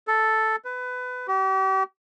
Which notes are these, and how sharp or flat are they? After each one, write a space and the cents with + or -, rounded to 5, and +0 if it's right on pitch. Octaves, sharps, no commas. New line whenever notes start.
A4 +0
B4 +20
G4 -40